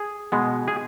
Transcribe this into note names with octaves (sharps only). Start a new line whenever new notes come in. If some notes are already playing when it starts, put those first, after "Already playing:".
Already playing: G#4
B2 G#3 B3
G#4